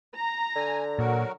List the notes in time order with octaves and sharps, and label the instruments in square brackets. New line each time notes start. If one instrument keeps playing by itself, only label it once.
[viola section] A#5
[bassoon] D3 [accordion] G#5
[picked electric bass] A#2 [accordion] F#3 F#4 A#4